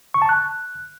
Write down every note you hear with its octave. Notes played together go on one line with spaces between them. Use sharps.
C#6
A5
F#6